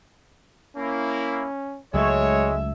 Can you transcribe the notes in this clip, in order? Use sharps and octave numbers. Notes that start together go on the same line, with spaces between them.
A#3 C#4 E4
C#2 F#3 G#3 A3 C#5 E5